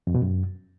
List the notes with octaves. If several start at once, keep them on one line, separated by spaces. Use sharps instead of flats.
F2
B2
F#2